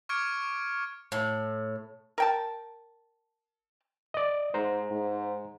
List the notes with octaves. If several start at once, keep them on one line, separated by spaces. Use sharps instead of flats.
C#6 D6 F6 G#6 C#7 D7
A2
A#4 G5 A5
D5 D#5
G#2 C5 A#5
G#2